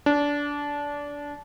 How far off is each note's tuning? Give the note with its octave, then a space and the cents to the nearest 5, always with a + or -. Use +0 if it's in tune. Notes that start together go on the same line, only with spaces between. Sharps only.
D4 -20